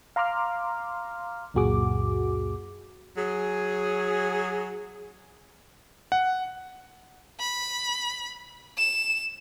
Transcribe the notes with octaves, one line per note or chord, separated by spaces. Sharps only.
F5 A#5 C6 D6 F6
C#2 F#2 A#2 F#4 G#4 D6
F#3 G#4
F#5
B5
E7